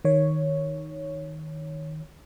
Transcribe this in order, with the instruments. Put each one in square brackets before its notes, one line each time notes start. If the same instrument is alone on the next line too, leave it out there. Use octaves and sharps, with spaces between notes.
[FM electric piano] D#3 C#5